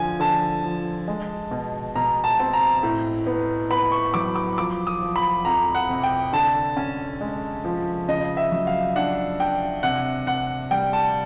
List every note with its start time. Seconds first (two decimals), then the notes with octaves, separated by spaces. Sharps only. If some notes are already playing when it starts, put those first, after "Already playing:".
Already playing: D3 F3 G#5
0.20 D3 A5
0.64 F3
1.08 G#3
1.51 B2
1.96 B2 A#5
2.24 A5
2.39 C4
2.53 A#5
2.83 A2
3.27 B3
3.70 B3 B5
3.92 C#6
4.14 F#3 D6
4.36 D6
4.58 F3 D6
4.87 D#6
5.02 F3
5.16 B5
5.45 F2 A#5
5.75 F#5
5.89 C3
6.04 G5
6.33 D3 A5
6.77 C#4
7.21 G#3
7.65 F3
8.08 C#3 D#5
8.37 E5
8.52 F#3
8.67 F5
8.96 D4 F#5
9.40 D4 G5
9.83 C3 F#5
10.26 C3 F#5
10.71 G3 G5
10.93 A5